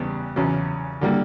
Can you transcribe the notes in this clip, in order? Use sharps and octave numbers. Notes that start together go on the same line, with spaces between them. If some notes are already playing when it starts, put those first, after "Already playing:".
Already playing: E2 C#3 G3 B3
E2 C#3 F#3 C#4
D3 G3 A#3